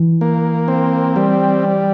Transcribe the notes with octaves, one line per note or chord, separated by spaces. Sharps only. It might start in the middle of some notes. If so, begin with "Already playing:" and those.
Already playing: E3
A#3
C4
G3